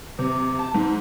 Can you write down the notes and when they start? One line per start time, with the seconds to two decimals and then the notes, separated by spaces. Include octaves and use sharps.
0.19 C3
0.59 A5
0.74 G#2